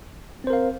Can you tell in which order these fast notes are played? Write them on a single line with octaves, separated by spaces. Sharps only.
C4 C5 A#4 F5